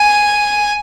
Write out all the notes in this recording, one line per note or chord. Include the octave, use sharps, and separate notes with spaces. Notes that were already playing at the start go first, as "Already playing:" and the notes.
Already playing: G#5